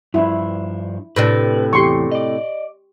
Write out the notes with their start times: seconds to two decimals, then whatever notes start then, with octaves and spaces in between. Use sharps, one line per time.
0.14 G2 F3 D4 E4
1.16 A2 C3 D4 B4
1.73 E2 G4 C6 C#6
2.12 D5 D#5